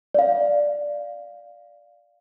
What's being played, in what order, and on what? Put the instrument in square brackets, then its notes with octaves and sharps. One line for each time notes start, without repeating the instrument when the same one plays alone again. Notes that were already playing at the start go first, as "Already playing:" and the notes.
[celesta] D5 F5